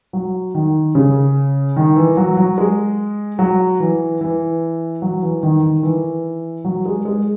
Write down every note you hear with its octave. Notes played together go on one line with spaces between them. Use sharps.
F#3
D#3
C#3
D#3
E3
F#3
F#3
G#3
F#3
E3
E3
F#3
E3
D#3
D#3
D#3
E3
F#3
G#3
G#3